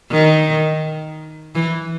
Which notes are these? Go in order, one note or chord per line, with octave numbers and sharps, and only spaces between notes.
D#3
E3